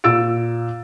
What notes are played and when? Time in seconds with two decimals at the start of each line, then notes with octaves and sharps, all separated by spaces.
0.04 A#2 E6 A6 D7